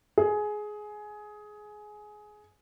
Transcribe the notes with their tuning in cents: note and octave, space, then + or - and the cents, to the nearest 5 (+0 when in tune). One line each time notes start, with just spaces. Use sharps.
G#4 +15